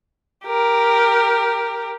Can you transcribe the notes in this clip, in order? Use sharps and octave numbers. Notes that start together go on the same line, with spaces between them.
G4 A#4